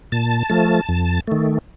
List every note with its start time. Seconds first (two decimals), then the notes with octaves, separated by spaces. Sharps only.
0.12 A#2 A5
0.50 F3 A3
0.89 F2
1.28 D#3 A3